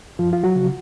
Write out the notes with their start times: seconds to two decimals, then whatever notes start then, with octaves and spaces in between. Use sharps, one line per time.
0.19 F#2 F3 F4
0.33 F4
0.44 F#3 F#4
0.55 C#3 F3